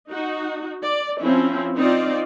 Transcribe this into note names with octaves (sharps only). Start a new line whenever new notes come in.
D#4 F#4
D5
F3 C4 C#4 E4
C4 D#4 F4 D5